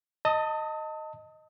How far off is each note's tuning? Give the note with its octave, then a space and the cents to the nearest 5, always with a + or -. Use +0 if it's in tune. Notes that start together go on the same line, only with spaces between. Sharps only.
D#5 +0 A5 +30 D#6 +35